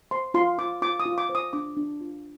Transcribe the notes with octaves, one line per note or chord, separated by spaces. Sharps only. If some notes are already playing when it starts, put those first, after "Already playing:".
C5 C6
F4 C6
F4 D6
F4 D6
D#6
F4
D6
C5
D#6
D4 D6
D4
F4